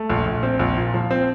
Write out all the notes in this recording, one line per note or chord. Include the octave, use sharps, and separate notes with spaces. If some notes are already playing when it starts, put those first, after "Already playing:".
Already playing: A3
A#1
A#1
C4
A#1
A#2
F3
C4